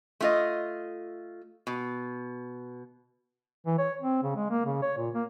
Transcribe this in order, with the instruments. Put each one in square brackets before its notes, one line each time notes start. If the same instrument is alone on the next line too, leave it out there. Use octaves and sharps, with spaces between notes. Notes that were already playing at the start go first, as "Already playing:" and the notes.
[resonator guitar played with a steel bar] A3 F4 D#5
B2
[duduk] E3
C#5
C4
C#3
G#3
A#3
C#3
C#5
A#2
A#3